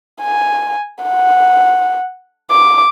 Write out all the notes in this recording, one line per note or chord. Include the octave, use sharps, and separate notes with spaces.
G#5
F#5
D6